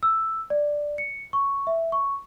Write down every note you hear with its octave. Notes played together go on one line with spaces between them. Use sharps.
E6
D5
C#7
C#6
E5
C#6